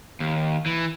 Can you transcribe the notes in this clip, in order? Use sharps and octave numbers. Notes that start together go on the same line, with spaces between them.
D#2
E3